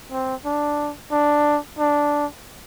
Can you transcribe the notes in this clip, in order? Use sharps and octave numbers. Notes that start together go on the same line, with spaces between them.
C4
D4
D4
D4